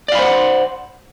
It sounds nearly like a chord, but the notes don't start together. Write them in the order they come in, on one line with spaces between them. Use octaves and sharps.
D5 F5 B5 C5 F#5